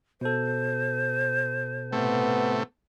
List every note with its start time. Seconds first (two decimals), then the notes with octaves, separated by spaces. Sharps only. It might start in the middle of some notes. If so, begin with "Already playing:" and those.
0.21 B2 A4 C5
1.93 A2 C3 A3 B3